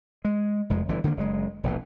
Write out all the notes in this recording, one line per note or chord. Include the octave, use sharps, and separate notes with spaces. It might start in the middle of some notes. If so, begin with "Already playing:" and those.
G#3
F1 F2 G#3
G1 D3 E3
D3 D#3 A3 A#3
F#1 C#3 G#3
E1 A#1 E3